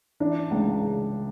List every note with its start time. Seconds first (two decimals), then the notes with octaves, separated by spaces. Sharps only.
0.20 E3 D4
0.51 C#2
0.82 C#3